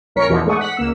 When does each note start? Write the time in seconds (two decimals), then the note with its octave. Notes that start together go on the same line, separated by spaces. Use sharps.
0.15 A#1 C#4 A#4 C#5 B6 C#7
0.28 E2 B2 E3 F3
0.46 G#2 G#3 A3 D5 C#6 D#6
0.57 F#5 B6
0.77 C#2 A#3 E6